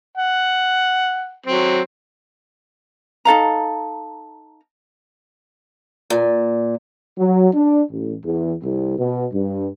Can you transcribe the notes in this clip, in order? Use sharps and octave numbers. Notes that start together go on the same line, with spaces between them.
F#5
F#3 C4
D#4 A4 F5 A#5
A#2
F#3
D4
A1
E2
C2
B2
G2